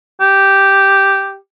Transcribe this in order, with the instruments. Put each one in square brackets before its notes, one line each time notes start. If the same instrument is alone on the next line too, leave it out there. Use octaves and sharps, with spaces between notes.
[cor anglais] G4